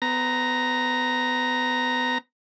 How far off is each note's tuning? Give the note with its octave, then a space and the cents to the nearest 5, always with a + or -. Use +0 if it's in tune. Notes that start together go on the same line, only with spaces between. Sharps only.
B3 +30 A#5 +0